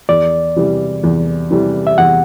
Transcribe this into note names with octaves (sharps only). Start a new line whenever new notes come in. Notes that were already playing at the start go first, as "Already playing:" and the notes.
E2 D5
C3 E3 G3
E2
C3 E3 G3
E5
E2 F#5